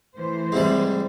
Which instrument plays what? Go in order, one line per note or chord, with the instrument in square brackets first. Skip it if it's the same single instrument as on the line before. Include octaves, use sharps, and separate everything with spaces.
[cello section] E3 A3 C5
[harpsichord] G#2 C3 G3